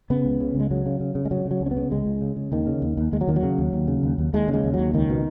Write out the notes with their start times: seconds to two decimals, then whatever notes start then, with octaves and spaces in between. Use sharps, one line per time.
0.10 C#3 B3
0.25 C#2
0.40 C#3
0.55 C#2
0.60 G#3
0.71 C#3 F#3
0.86 C#3
1.00 C#3
1.15 C#3
1.25 G#3
1.31 C#3 F#3
1.46 C#3
1.51 F#3
1.61 C#2
1.66 C#4
1.71 B3
1.77 C#3
1.91 C#2 G#3
2.06 C#2
2.21 C#3
2.36 C#3
2.52 D#2 D#3
2.67 C#3
2.82 D#2
2.97 D#2
3.12 D#2 G#3
3.21 F#3
3.27 D#2 D#3
3.36 F#3
3.43 C#3
3.58 D#2
3.73 D#2
3.88 C#3
4.03 D#2
4.18 D#2
4.33 D#2 G#3
4.48 C#3
4.54 G#3
4.64 D#2
4.74 F#3
4.79 D#2
4.94 C#2 D#3
5.10 B2